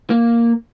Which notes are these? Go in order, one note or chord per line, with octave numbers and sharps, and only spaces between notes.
A#3